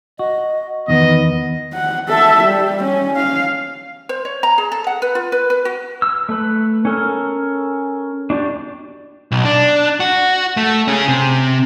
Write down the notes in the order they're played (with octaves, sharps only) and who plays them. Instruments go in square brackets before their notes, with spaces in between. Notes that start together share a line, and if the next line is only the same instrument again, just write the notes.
[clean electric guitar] F#4 [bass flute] D#5
[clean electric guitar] E2 D#3 [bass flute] B3 [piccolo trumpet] D#5
[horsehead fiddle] F#5
A4 E5
G3
C#4
F5
[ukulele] C5
C#5
A#5
G#4
A4
F#5
B4
F4
B4
B4
F#4
[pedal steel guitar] E6
A3 B4
C#4 A4 A#4
D4 F#4 G4 D5
[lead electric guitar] B1
D4
F#4
A3
C#4 G#4
C3